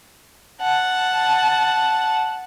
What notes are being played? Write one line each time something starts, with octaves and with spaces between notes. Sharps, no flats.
F#5 A5